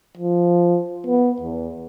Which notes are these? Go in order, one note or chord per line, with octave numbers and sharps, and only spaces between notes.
F3
B3
E2